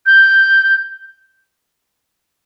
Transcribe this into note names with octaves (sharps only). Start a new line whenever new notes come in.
G6